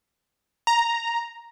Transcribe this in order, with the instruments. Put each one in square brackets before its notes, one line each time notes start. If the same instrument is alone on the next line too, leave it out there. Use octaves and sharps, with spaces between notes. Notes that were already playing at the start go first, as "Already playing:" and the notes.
[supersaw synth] A#5